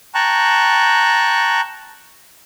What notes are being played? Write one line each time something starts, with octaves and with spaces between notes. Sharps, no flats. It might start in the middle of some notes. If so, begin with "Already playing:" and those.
G5 A5 A#5 C#6 F#6